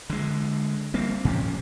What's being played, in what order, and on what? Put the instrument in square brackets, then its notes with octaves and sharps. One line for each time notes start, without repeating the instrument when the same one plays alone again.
[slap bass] D3 G#3
G3 A#3 C4
A2 F3 C#4